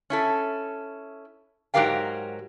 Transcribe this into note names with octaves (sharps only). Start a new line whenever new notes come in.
C#4 E4 A4
G#2 F#3 G4 A#4 F5 G5